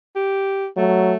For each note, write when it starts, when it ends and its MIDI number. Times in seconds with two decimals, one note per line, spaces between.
0.16 0.67 67
0.77 1.13 54
0.77 1.17 57